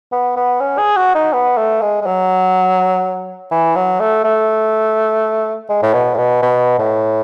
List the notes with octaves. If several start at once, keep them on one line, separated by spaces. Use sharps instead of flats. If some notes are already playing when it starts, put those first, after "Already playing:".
B3
B3
C#4
G#4
F#4
D#4
B3
A3
G#3
G#3
F#3
E3
F#3
A3
A3
G#3
A2
B2
A2
B2
B2
A2